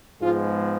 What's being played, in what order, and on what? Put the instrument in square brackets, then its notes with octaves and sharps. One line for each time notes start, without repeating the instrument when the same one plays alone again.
[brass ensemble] G#2 F3 G#3 B3 F4